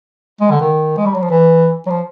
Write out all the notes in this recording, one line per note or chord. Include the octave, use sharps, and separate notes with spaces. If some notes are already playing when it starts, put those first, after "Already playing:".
G#3
D3
D#3
G#3
G3
F#3
F3
E3
F#3
F3